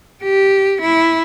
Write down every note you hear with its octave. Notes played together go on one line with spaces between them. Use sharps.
G4
E4